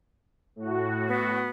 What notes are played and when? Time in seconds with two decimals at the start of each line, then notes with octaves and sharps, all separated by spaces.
0.56 A2 F#4
1.08 B3